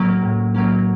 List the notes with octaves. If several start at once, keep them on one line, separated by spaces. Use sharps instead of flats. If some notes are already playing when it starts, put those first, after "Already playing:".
Already playing: A2 F#3 A#3 C#4
A2
F#3 A#3 C#4